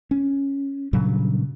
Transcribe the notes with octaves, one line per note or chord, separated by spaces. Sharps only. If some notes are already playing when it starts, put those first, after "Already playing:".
C#4
G2 A#2 C#3 F#3